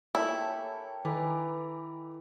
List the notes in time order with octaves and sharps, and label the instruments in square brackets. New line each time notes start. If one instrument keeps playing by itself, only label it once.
[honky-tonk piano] A#3 A4 C#5 [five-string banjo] E4 [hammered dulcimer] G4 [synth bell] G#5
[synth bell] D#3 A4 B4 [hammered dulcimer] E3 [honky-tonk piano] A#5 D6